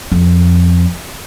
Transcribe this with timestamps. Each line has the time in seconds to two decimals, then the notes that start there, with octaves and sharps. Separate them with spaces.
0.12 F2